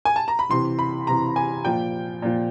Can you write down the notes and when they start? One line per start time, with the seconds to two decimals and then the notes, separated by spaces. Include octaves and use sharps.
0.05 G#5
0.16 A5
0.28 A#5
0.39 B5
0.49 C3 E3 C6
0.79 B5
1.07 C3 E3 A#5
1.36 G#5
1.65 A#2 F3 G5
2.22 A#2 F3